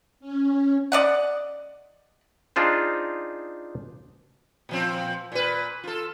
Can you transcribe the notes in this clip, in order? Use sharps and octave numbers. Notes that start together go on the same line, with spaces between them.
C#4
D5 D#5 F#5
D4 D#4 F4 G#4 C5
A#2 F3 C4
A#2 B4
F4 A4